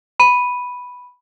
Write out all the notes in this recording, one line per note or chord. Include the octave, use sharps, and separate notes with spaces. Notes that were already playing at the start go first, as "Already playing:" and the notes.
B5 D#7